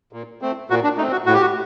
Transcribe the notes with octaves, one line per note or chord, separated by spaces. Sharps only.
A#2
A3 C4
A#2 F#4
D4
A3 C4 D#4
F#4
A2 F#4
G4
F#4